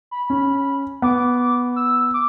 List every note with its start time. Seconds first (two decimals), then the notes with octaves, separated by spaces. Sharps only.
0.11 B5
0.30 C#4
1.02 B3 D6
1.76 E6
2.14 D6